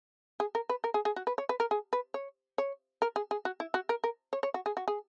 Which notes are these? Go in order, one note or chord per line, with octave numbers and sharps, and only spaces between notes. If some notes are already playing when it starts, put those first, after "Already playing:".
G#4
A#4
B4
A#4
G#4
G#4
F#4
B4
C#5
B4
A#4
G#4
B4
C#5
C#5
A#4
G#4
G#4
F#4
E4
F#4
A#4
A#4
C#5
C#5
F#4
G#4
F#4
G#4